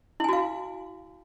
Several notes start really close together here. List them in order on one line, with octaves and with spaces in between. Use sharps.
E4 G#5 F#4 F5